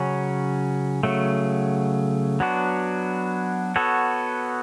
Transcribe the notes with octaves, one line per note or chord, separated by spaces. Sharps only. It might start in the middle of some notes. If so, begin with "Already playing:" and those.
Already playing: C#3 F#3 C#4
C#3 F#3 A3
F#3 B3 D4 F#4
B3 F#4 A4 C#5